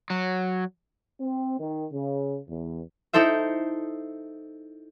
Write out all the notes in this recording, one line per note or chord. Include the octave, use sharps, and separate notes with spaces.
F#3
C4
D#3
C#3
E2
D#4 E4 A4 C5 E5